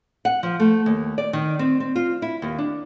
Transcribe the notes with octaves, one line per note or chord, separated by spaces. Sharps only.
F#5
F3
A3
D#2
D5
D#3
C4
C4
F4
E4
D#2
D4